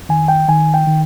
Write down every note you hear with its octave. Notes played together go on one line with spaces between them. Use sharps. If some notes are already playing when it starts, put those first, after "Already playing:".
Already playing: F2
D#3 G#5
G5
D#3 G#5
G5
D#3